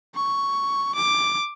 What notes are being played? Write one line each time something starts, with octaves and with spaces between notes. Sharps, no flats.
C#6
D6